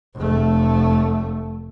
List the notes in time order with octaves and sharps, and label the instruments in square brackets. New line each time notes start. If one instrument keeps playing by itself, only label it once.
[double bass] F1 A3